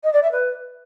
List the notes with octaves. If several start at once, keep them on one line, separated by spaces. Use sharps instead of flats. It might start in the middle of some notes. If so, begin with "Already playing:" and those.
D#5
D5
E5
B4